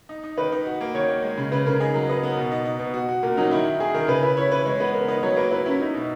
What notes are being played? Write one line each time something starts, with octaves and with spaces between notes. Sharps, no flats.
D#4
D#4
D#3 B4
D#4
F#4
A#3
D#3 C#5
A#3
G#3
C#3
C#3 B4
C#3 A#4
D#4 G#4
F#3 A#4
D#4 B4
B3 A#4
B2
D#4
D#4
B2
F#4
F#4
A#2 A#4
F#3 D#4
D#3 E4
D#3
D#3 G#4
D#3 A#4
C#3 B4
E4 B4
E4 C#5
E3 B4
G#3 C#5
B3 B4
B3 A#4
D#4 B4
F#3 C#5
A#3 B4
E4 B4
C#4 E4
D#4 E4
B2